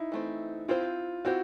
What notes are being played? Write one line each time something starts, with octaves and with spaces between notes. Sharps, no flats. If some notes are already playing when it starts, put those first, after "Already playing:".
Already playing: D#4 E4
E3 A3 C4
C4 E4 F4 G4 C5
C4 E4 F#4 G4 C5